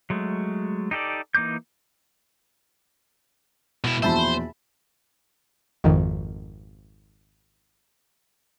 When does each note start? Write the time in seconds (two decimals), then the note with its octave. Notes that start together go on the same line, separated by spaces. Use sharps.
0.10 F#3 G#3 A3
0.91 D#4 G4 A4 D5
1.35 E3 A#3 D#4 D6 G6
3.84 B2 E4
4.03 A#1 E2 B2 C5 E5 A5 B5
5.84 G#1 F2 D#3